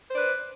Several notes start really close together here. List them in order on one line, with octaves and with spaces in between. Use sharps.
C5 D5 B4